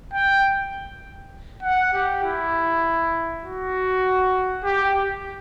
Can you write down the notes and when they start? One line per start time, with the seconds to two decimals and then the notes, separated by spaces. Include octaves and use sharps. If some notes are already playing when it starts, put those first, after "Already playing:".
0.13 G5
1.63 F#5
1.94 G4
2.23 E4
3.44 F#4
4.64 G4